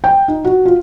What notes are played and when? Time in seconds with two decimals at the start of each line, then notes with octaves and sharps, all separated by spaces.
0.04 G5
0.28 D#4
0.45 F#4
0.65 F4